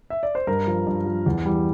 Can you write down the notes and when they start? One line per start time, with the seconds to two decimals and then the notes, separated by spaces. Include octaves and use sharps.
0.10 E5
0.23 D5
0.35 C5
0.47 G2 A#4
0.67 F3
0.87 G2
1.06 F3
1.26 E2
1.45 E3 G3